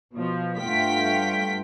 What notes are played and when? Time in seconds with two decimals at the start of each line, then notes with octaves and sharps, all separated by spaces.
0.13 B2 F3
0.60 G2 A3 F4 F#5 G5 B6